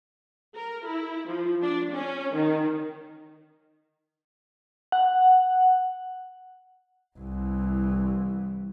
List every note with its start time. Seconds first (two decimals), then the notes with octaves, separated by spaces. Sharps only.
0.56 A#4
0.87 E4
1.28 F3
1.62 D4
1.92 C#4
2.34 D#3
4.92 F#5
7.18 C2 E3